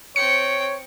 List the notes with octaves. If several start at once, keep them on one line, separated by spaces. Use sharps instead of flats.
C4 C#5 G5 C#7